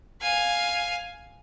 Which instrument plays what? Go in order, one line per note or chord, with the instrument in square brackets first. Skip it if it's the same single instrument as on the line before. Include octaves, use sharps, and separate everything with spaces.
[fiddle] F5 G#5